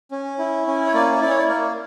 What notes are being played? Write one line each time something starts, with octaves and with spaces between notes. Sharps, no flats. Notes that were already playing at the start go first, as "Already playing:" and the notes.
C#4
E4
C#4
C#5
A#3 D5
E4 D5
C#5
D5
A#3 A#4